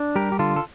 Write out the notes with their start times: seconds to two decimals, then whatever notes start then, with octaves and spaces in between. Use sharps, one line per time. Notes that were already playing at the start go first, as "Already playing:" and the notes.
Already playing: D4
0.15 G3 G4 A#4
0.32 G4
0.39 D3 F4 A4
0.56 A4